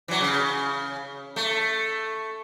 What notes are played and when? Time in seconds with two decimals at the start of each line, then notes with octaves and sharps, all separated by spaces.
0.08 E3 F#3
0.21 C#3
1.36 A3